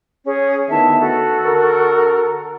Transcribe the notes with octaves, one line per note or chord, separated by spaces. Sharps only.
C#4 G#4
D2 D#3 B3 E4 E5 A5
F#4 A4
D3 A#4